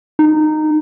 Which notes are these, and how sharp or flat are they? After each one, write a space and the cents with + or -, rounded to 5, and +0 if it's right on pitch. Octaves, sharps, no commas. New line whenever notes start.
D#4 -15